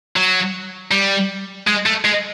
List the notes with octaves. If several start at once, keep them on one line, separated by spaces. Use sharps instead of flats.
F#3
G3
G#3
A3
G#3